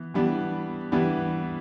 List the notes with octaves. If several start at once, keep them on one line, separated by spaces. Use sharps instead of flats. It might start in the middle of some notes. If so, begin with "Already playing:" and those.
Already playing: E3 B3
E3 G3 B3 D4
E3 G3 B3 D4